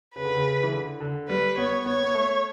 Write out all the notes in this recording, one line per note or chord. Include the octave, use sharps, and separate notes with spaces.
C#3 B4
D3
C#3
E3
D3
D3
G3 B4
B3 C#5
B3 C#5
B3
A3